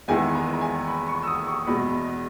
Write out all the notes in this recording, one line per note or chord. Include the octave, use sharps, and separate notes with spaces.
E2 D#3 G#3 B3 E4 G#5
A#5
A#5
G#5
B5
C#6
E6
D#6
C#6
E2 B2 G#3 B5